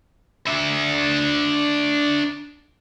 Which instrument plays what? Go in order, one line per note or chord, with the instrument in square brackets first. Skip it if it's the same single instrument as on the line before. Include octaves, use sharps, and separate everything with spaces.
[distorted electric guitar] D4 E5